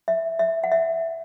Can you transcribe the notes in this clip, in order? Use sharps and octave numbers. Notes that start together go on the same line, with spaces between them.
E5
E5
F#5
E5